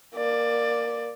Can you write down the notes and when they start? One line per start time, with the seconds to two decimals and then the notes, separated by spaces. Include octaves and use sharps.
0.16 A#3 D5